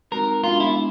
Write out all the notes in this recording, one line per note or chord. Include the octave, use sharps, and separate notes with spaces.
G#3 C4 D#4 F#4 A#4
G#3 B3 D4 F4
E4